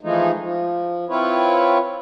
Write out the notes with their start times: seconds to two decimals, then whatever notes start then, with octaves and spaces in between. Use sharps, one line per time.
0.01 E3 F3 G#3 A3 D#4
0.40 F3
1.09 C4 E4 F4 B4 C#5